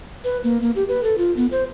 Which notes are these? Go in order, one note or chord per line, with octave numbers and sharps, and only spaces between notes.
B4
A#3
A#3
G4
B4
A4
F4
B3
C5